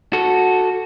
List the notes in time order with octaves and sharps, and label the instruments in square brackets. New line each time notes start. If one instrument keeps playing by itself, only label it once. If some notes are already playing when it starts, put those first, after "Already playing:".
[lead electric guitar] F#4 A4